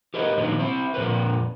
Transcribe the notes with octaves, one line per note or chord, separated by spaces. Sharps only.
G4 A#4 B4 D#5
A#2 D#3 F3 F#3 B3
C4 E4
F2 A#2 F3 A#4 B4